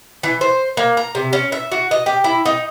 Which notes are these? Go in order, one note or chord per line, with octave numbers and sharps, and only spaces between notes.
E3
C5
A#3
A#5
C3
C#4
E5
F#4
D#5
G4
E4
D#4